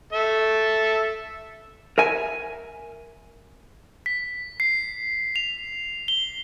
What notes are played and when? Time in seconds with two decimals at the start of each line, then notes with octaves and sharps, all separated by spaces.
0.13 A4 E5
1.98 A#4 E5 G#5
4.06 B6
4.60 C7
5.36 F7
6.08 G7